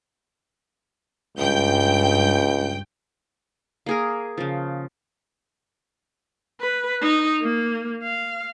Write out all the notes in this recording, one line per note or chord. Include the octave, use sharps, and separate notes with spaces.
C#2 G2 G5 G6
A#3 G#4 A#4
C#3 F3
B4
D#4
A#3
F5